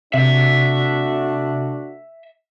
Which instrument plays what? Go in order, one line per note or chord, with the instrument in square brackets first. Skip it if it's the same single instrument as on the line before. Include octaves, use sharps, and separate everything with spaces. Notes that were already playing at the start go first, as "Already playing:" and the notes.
[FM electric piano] C3 [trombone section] A3 D4 F#4 [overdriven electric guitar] E5